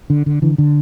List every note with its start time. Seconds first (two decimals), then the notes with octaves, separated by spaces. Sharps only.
0.10 D3
0.26 D3
0.42 D3 E3
0.58 D3